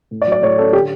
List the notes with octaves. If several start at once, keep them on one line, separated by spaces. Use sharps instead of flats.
A2
D5
F#3
D5
A2 C#5
C#4 A4
D3 G4